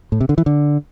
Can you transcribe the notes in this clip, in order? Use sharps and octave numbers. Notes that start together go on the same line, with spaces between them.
A2
C3
D3
E3
D3